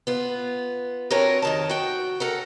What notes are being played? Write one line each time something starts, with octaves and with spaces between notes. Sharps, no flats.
B3 F4
C4 D4 F#4 A#4 B4 C#5
F2 D#3 A5
F#4 G5
A4 A#4 F#5